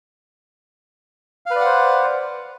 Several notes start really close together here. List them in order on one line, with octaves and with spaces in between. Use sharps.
F5 B4 D5 F#5 C5